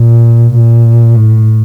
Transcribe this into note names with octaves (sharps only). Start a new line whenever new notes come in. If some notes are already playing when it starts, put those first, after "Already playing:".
Already playing: A#2
A#2
A2